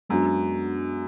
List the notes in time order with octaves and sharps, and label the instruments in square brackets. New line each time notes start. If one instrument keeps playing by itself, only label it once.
[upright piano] F#2 [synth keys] G#3 B3 D4 F#4